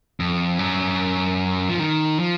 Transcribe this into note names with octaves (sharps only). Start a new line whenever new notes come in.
F2
F#2
F3
D#3
F3